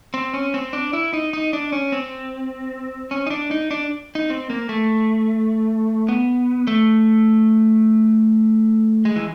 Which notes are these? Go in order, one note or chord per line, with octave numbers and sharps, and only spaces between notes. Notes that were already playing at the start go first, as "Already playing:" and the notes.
C4
C#4
C4
D4
E4
D#4
D#4
D4
C#4
C4
C#4
D#4
D4
D#4
D4
D#4
C4
A#3
A3
B3
A3
G#3
E3